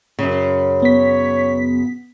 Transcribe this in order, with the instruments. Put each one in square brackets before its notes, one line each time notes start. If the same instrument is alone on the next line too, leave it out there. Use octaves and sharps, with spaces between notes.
[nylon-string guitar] F#2 C#3
[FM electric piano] B3 B6 [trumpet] C#5